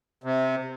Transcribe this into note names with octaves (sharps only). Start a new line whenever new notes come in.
C3